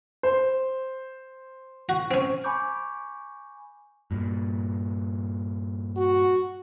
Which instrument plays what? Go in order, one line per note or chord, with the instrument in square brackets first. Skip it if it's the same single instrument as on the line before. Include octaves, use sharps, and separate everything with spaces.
[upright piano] C5
[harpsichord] F#4
C4 C#4
[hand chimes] G#5 B5 C#6 D6 G6
[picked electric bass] G2 A#2
[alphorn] F#4